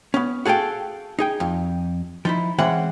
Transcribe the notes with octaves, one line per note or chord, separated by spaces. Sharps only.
B3 C#4
F#4 G#4 A4 F5 G5
D#4 G#4 G5
F2
F3 D#4 E4
E3 G#3 C4 C#4 F#5